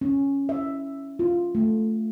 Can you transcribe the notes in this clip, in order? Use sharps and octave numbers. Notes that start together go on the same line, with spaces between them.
C#4
E5
F4
A3